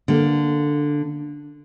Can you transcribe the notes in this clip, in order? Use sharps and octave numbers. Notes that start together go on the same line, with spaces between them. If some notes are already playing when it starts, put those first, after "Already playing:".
D3 A#3